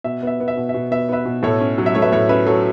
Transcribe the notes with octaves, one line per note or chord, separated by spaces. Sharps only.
B2 E5
B3 E5
B3
E5
B2
E5
B2
B3 E5
B3 B4 E5
B2
A2 A4 C#5
C#4
F#3
E5
A3 C#5
B4 E5
A2 A4 C#5
C#4 B4 E5
F#3 A4 C#5